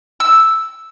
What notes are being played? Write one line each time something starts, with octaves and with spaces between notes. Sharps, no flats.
E6